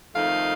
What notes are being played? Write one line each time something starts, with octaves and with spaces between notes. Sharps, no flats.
F2 D#3 A3 D#4 F5